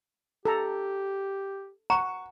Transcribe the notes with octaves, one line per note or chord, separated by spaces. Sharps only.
G4 A4 A#5
F#5 A#5 C#6